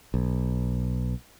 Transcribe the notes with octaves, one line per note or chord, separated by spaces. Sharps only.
B1